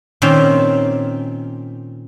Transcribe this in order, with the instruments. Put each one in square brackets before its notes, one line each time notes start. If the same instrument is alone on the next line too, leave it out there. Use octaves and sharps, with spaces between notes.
[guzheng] A#2 D#3 C4 C#4 C6